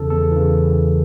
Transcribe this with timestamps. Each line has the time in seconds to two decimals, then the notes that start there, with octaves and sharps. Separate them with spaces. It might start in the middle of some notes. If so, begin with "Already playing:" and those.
Already playing: E2 C#3 E3 A4
0.10 E2 A4
0.31 C#3 E3